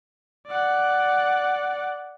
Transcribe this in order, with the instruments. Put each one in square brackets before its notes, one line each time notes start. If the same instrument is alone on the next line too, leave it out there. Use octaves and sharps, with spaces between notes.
[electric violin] D5 F#5